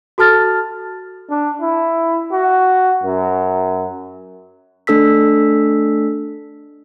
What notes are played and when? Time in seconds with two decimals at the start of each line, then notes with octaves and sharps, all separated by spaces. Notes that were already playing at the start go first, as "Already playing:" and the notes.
0.18 F#4 A4 A5 F6 A6
1.30 D4
1.62 E4
2.32 F#4
3.03 F#2
4.87 A3 D4 A4 E6 B6